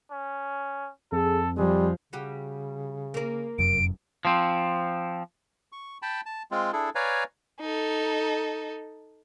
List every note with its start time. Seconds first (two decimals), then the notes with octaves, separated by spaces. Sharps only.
0.11 C#4
1.12 F2 G#4 A4
1.57 F3 G3 G#3
2.13 C#3 G3 F#4 G4
3.14 A#3 A#4
3.59 F1 F#2 D7
4.25 F3 C4
5.72 C#6
6.02 G5 A5 B5
6.26 A5
6.51 G#3 C4 F4
6.73 D4 E4 G#4 A4
6.95 B4 C#5 D5 F5 G#5 A#5
7.61 D#4 A4